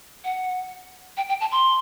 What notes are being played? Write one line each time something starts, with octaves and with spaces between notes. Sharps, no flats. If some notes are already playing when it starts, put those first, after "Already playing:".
F#5
G5
G5
A5
C6